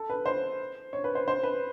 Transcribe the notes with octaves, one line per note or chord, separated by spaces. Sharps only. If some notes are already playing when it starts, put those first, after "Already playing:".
Already playing: A4
B4
C5
C#5
B4
C5
C5
B4